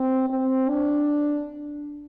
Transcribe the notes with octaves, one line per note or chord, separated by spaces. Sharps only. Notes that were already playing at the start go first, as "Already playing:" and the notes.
Already playing: C4
C4
D4